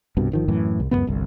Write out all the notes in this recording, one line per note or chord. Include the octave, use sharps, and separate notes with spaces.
C2 G2 B2
G1 D#3 F3
F#2 A2 E3
C2
C#2 F#2 C3 B3
G1 C2